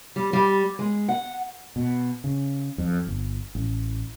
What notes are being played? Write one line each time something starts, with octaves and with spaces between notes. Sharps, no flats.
G3
G3
G#3
F#5
B2
C#3
F2
G1
A1